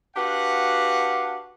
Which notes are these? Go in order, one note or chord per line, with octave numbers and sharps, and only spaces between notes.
D4 F#4 G4 B4 F5 F#5